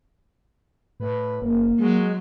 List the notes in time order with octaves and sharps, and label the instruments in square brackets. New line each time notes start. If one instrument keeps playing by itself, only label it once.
[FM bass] A2 [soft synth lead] B4
[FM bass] F#1 [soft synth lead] A#3
[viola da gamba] F#3 [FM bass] G#3